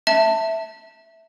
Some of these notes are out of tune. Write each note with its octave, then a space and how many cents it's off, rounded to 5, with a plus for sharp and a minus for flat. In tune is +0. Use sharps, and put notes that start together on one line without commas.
E5 -5 A5 +25